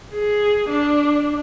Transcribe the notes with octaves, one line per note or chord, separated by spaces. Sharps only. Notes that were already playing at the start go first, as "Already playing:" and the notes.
G#4
D4